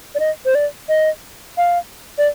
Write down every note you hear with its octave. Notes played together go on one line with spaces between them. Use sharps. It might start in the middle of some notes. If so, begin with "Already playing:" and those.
D5
D#5
C5
D5
D#5
F5
D5